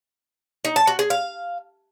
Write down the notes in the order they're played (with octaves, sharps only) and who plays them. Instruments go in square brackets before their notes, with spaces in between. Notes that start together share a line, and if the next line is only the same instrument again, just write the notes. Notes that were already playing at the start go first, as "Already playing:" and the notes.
[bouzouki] D#4
A5
F#4
G#4
F5